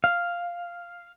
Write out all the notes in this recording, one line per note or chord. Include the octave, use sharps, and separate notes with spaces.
F5